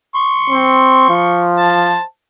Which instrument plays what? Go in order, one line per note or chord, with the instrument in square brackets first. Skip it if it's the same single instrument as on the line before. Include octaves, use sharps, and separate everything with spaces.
[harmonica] C6 C#6
[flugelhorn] C4
F3
[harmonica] C5 A5